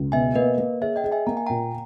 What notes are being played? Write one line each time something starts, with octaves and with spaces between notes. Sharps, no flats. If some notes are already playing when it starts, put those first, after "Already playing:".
Already playing: C#2
B2 E5 G#5
A#3 B4 D#5
A#3
G#4 C#5 E5
D#5 G5
G#4
E5 G#5
A#3 A#5
G#5
A#2 G5 A#5